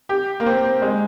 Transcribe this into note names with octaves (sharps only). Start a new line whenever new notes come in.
G4
A#3
C4
C4
G#3